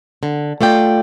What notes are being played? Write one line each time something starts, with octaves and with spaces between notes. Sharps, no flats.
D3
A3 F4 D5 G5